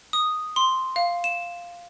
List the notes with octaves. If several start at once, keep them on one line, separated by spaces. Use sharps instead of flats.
D#6
C6
F5
E7